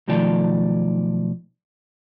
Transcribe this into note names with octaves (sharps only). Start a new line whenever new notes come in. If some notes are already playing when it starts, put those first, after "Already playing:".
B1 D#3 F3 A3 D5